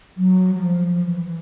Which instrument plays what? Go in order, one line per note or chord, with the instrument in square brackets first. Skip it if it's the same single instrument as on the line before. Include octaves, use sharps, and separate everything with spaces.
[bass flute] F#3
F#3
F3
E3